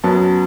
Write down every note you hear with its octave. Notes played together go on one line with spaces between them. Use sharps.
F#2 F#3 B3 A5